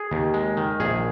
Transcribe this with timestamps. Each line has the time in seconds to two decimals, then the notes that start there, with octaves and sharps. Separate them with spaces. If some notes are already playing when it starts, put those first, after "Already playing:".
Already playing: G#4
0.11 D#2
0.34 G#3
0.57 D#3
0.80 A#1 G#4